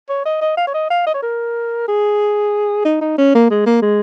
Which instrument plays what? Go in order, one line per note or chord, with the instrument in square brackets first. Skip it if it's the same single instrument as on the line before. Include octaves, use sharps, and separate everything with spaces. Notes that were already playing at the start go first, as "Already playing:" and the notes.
[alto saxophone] C#5
D#5
D#5
F5
C#5
D#5
F5
D#5
C#5
A#4
G#4
D#4
D#4
C#4
A#3
G#3
A#3
G#3